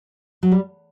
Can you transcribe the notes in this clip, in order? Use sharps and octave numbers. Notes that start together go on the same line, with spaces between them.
F#3
G3